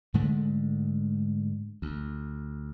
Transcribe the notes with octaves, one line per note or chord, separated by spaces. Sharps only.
G#2 D3 G#3 A3
D2